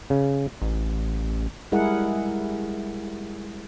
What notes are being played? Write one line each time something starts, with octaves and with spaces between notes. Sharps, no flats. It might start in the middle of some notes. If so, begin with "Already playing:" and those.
C#3
A1
G3 G#3 E4 G#4 A#4 F#5